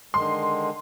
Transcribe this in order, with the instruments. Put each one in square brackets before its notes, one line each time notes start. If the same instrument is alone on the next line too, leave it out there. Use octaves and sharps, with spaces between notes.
[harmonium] D3 D#3 G#3 [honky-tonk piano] C6